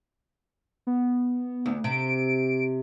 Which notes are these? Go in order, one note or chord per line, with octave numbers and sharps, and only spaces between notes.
B3
D2
C3 D7